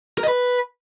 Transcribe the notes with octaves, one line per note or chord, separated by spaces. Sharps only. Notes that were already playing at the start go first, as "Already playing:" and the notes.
A#4
D#5
B4